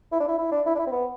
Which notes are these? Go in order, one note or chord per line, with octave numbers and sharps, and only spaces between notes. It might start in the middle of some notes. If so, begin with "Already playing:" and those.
E4
D4
E4
E4
D4
E4
D4
E4
C4
B3